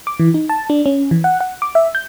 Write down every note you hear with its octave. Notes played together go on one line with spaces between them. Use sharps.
D6
E3
D#4
A5
D4
C#4
E3
F#5
F#5
D6
E5
G6